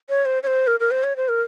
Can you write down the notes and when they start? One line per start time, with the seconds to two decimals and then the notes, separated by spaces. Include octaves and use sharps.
0.09 C#5
0.25 C5
0.43 C#5
0.47 C5
0.67 A#4
0.80 A#4
0.91 C5
1.04 C#5
1.16 C5
1.29 A#4